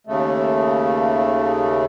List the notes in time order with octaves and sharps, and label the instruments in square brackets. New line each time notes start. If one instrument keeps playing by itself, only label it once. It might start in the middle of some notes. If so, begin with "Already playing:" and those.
[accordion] D#2 C#3 A3